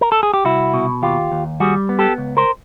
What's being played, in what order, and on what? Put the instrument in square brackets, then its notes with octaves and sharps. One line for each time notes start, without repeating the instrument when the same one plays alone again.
[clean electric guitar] A#4
A4
G#4
G4
C2 E4 F#4
B2
D#2 F4 G4
D#2
G3 F#4 G#4
B3
G4 A4
C#2
A#4 C5